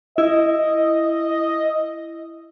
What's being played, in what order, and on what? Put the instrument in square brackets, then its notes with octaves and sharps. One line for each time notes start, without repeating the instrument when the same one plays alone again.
[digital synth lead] E4 [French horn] D#5